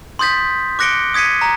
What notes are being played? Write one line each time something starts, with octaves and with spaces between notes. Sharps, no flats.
C6 D#6 G6 A6 B6
D6 F#6 A#6 C#7 D7 G7
D#6 G#6 B6 C#7 D#7
A#5